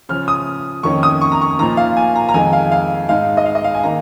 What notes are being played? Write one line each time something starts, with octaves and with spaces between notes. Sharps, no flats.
C#3 F3 C#4 F6
D#6
F2 D#3 A#3 C#4 C#6
D#6
C#6
A#5
C#6
A#2 F3 A#3 D#4 A#5
F5
G#5
A#5
A#5
F2 D#3 G#3 G#5
F5
F5
G#2 G#3 D#4 F5
D#5
F5
D#5
F5
G#5
D#3 A#3 D#4 A#5